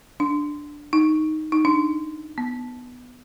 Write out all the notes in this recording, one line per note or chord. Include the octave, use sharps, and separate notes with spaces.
D4
D#4
D#4
D4
B3